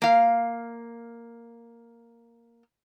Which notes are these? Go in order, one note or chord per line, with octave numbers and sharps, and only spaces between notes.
A#3 F5